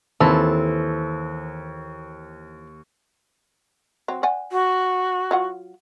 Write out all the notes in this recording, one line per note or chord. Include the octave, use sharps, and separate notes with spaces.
D#2 E3 C4 A4
F#3 C4
D5 F#5 G#5
F#4
F#3 F4 F#5